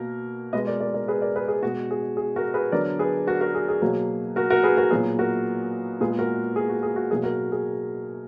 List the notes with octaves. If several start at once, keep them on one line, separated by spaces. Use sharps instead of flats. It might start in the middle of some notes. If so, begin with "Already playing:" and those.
Already playing: B2 A#3 A#4
B2 G#3 B3 B4 D#5
A#4 D5
A#4 D5
A#4 D5
G#4 B4
A#4 D5
G#4 B4
G#4
B2 G#3 B3 F#4
G#4
G#4
F#4 A#4
G#4 B4
D3 F#3 B3 A#4 D5
G#4 B4
F#4 A#4
F#4 A#4
G#4
G#4
B2 F#3 A#3
F#4 A#4
F#4 A#4
G#4 B4
F#4 A#4
A#2 F#3 B3 G#4
F#4 A#4
A#2 G#3 B3 G#4
F#4 A#4
G#4
F#4
G#4
F#4
B2 F#3 A#3 G#4
F#4 A#4
G#4